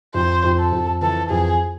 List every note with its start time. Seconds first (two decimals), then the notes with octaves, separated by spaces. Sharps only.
0.14 F2 C5
0.44 F2
0.59 A4
0.72 F2
1.02 E3 A4
1.30 F2 G#4